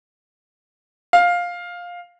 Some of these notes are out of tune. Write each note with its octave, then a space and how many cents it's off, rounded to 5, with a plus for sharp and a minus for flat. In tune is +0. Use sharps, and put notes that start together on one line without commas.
F5 +10